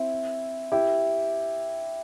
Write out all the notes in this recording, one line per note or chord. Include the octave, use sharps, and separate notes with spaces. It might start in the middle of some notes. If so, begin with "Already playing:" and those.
Already playing: C4 E4
E4 G4